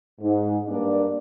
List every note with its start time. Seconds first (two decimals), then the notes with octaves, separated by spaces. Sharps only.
0.21 G#2
0.67 G2 A#3 D4 D5